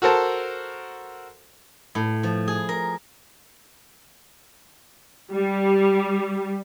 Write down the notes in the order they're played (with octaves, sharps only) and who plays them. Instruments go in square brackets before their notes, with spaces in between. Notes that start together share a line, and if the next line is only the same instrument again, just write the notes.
[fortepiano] F#4 A4 A#4 C5 A5
[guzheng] A2
F3
G#4
A#4
[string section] G3